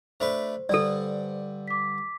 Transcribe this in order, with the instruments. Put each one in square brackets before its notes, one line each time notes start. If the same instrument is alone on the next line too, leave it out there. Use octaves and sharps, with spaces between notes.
[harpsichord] A3 D4 B4 [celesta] C5
[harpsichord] G2 D3 [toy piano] A4 D5
[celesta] D6 B6